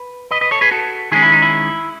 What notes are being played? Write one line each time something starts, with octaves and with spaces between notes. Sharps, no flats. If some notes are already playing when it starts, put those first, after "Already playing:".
Already playing: B4
B4 D#5
B4 D#5
A4 C#5
G#4 B4
F#4 A4
D#3 G#3 C#4 E4 G#4
E4
D#4
E4